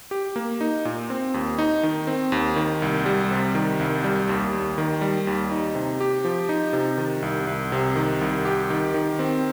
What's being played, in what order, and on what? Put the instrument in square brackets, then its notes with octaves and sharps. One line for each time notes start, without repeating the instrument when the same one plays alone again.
[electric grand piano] G4
A#3
D#4
A#2
C4
D#2
D#4
D#3
C4
D#2
D#3
C2
G3
C3
D#3
C2
G3
D#2
D#2
D#3
G3
D#2
D#4
C3
G4
F3
D#4
C3
D#3
C2
C2
C3
D#3
C2
G4
D#3
D#3
C4